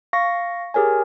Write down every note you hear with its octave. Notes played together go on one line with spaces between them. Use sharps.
F5 C#6 A#6
G4 G#4 A#4 C#5 G#5